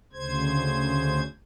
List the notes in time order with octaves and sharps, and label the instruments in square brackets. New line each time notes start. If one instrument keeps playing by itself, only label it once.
[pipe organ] D2 C#3 C5 G#6